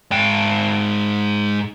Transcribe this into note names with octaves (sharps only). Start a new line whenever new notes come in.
G#2 G5